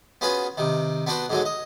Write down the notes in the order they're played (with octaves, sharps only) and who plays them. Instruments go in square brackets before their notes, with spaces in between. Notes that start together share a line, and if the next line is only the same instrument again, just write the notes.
[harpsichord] B3 C#4 F4 F#4 G#4 B4
C3 D#3
B3 D4 F#4 B4 C5
G#2 D3 F#3 G#3
D#5